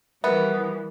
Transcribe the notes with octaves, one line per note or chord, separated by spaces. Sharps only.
E3 F3 G3 B3 G4 A#4 E5